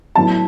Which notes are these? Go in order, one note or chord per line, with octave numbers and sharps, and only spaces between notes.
A2 F#3 B3 A5